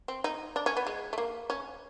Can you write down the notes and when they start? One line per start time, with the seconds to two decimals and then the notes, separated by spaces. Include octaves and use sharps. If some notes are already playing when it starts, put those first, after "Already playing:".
0.08 C4
0.24 D#4
0.56 D4
0.66 C#4
0.77 B3
0.87 G#3
1.13 A3
1.18 A#3
1.50 C#4